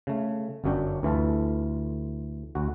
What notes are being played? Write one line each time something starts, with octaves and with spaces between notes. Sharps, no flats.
C#3 A3
G1 F#2 F#3 C#4 D4 G5
D2 E3 F4 A4 A5
D2 F#4